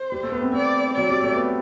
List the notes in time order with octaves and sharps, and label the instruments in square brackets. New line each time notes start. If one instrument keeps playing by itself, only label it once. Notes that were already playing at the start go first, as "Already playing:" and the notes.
Already playing: [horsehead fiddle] C5
[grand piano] G3
A3
B3
C4
[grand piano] C4 [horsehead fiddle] D5
[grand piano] F#3 [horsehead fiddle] D5
[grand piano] G3
A3
B3